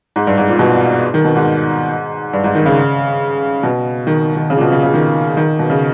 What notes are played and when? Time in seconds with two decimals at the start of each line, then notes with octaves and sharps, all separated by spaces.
0.16 G#2
0.27 G2
0.38 G#2
0.48 A#2
0.59 B2
1.14 D#3
1.24 B2
1.35 G#2
2.33 G2
2.44 G#2
2.55 D#3
2.66 C#3
3.63 B2
4.07 D#3
4.36 D#3
4.50 C#3
4.57 A#2
4.61 B2
4.72 C#3
4.83 C#3
4.94 D#3
5.37 D#3
5.59 B2
5.70 C#3